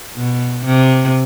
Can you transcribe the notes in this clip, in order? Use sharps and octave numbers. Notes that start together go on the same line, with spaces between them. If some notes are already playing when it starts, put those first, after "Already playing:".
B2
C3